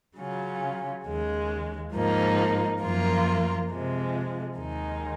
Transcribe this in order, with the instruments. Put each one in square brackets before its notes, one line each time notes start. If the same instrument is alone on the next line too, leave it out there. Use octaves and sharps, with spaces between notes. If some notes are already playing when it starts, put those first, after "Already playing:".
[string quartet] C#3 F#3 C#4 F4
D#2 C#3 G#3
G#2 F3 A#3 D#4
F#2 F3 A#3 F4 A#4
C3 F3 G#3
D#2 D#3 G#3 D#4